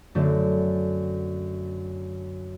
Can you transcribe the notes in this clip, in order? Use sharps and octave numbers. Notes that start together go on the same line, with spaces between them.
F#2 D3 A3 D4